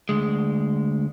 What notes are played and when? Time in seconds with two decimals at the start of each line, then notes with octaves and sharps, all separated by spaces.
0.09 D2 G#3